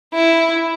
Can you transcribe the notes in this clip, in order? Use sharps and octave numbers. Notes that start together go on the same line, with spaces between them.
E4